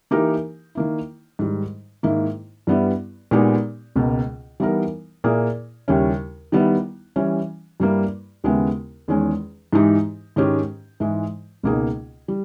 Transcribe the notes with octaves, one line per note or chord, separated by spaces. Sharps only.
E3 A#3 D#4 G4 A#4
D#3 A#3 E4
G#2 D#3 G3
G#2 D#3 A#3 E4
G2 G3 B3 E4
A#2 G#3 B3 D#4 G4
C#2 B2 A#3
E3 G3 B3 D#4 A#4
A#2 A#3 E4 G#4
D#2 C#3 G3 C#4 E4
D#3 G3 B3 E4
E3 G3 C#4
G2 G3 A#3 E4
D#2 C#3 G#3 B3 E4
E2 D#3 G#3 C#4
G#2 E3 G#3 D#4 G4
G#2 D#3 G#3 C#4 G4
G#2 E3 G#3
C#2 B2 A#3 D#4 G#4
G3